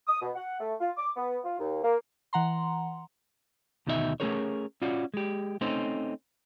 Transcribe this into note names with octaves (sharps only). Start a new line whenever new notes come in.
D#6
B2
F#5
A3
F4
D6
B3
F4
D#2
A#3
E3 F#5 A#5 C6
D2 B2 D#3 D#4 F#4 E5
A3 B3 C#4 G#4 A#4 C#5
C#4 F4 F#4 D5
G#3 G4
A3 C4 C#4 D#4 C5